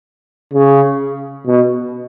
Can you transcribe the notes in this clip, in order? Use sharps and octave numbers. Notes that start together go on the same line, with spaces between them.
C#3
B2